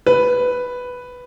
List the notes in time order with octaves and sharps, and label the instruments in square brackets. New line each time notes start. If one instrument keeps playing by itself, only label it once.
[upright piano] B4